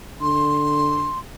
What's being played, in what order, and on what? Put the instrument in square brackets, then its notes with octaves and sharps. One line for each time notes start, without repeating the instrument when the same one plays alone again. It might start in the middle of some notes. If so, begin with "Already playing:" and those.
[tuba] D3 [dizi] C6